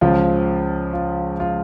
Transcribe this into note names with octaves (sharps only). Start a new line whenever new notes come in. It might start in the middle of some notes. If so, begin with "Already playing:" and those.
C#2 C#3 F3 F4
F4
F4